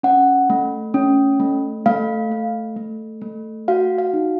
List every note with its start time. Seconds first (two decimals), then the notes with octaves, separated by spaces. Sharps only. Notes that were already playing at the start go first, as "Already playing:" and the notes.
0.03 C#4 F#5
0.50 A3
0.94 C#4
1.40 A3
1.86 A3 F5
2.31 A3
2.76 A3
3.22 A3
3.68 F#4 F5
3.98 F5
4.13 D#4